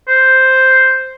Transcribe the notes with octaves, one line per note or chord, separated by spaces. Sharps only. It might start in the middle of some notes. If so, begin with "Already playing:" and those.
C5